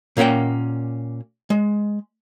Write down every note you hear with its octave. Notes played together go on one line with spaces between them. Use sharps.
A#2 A#3 C#4 F#5 G5
G#3